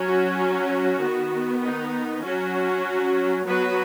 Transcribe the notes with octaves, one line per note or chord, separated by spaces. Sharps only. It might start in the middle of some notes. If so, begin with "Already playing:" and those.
Already playing: F#3 C#4
F#4
F#4
D#3 B3
D#4
F#3 C#4 F#4
F#3 B3 F#4 B4